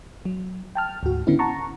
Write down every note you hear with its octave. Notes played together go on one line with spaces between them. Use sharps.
F#3
G5 A5 F6
D2 G#2 F#4
D3 B3 C#4 E4
F#5 A5 A#5 C#6